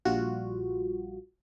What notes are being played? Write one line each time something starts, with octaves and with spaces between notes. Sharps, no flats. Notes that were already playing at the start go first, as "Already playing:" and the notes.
A#1 G3 F4 F#4